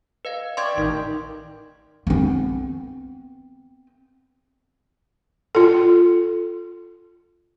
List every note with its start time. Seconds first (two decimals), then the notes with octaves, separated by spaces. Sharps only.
0.25 B4 D#5 F5
0.57 G4 D5 E5 C6 C#6 G#6
0.77 A1 D#3
2.07 B3 C4
5.55 F4 A4